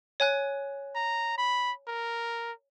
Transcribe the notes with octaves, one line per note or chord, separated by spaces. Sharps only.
C#5 G#5 F#6
A#5
B5
A#4